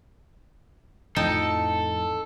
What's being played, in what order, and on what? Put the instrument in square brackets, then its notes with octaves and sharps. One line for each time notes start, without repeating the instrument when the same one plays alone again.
[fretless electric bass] F2 A2 F3 [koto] D#4 G5 A5 [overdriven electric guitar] A4